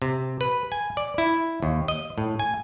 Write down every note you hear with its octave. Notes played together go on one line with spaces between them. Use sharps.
C3
B4
G#5
D5
E4
D#2
D#5
A2
G#5